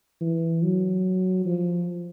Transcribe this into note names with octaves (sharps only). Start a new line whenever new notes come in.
E3
F#3
F3